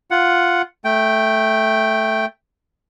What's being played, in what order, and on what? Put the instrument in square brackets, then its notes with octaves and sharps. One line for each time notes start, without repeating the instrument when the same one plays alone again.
[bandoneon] F4 F#5
A3 G5